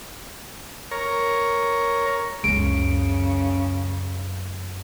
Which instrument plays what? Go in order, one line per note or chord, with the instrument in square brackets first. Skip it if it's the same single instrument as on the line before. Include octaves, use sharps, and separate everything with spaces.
[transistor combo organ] A#4 C#5
[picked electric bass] C#2 G#3 [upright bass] F#2 [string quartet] C#3 [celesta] D7